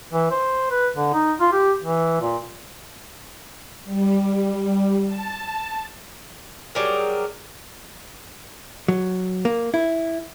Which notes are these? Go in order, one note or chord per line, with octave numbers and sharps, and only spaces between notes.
E3
C5
B4
D3
D#4
F4
G4
E3
A#2
G3
A5
F#3 G3 G#4 A#4
F#3
A#3
E4